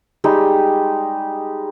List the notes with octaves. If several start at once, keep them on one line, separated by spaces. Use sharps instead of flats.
G3 G#3 D#4